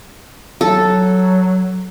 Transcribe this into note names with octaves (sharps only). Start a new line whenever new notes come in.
F#3 A4